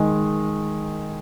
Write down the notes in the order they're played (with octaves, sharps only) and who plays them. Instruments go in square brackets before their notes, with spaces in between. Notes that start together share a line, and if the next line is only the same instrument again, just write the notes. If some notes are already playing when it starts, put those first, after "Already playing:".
Already playing: [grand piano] D#3 G#3